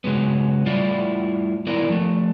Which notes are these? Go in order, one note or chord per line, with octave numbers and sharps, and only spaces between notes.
C#3 F#3 G#3 B3
A2 G3 E4 F4 D5
D#3 B3 E4 A#4 D5
F3 A3